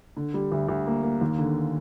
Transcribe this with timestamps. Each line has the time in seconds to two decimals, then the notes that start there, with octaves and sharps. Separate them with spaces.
0.17 D3
0.34 G3
0.52 D2
0.69 D2
0.87 A#3
1.03 A#3
1.21 D#2
1.39 D3